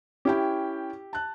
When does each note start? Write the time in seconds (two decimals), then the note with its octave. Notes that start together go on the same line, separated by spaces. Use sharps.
0.25 C#4 E4 G4 G5
1.13 A5 F#6